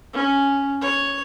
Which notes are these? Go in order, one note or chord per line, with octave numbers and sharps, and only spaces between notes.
C#4
C#5